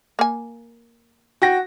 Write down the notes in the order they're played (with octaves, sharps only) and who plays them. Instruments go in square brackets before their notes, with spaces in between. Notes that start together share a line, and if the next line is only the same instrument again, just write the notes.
[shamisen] A#3 G#5
[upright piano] F#4 G5 A#6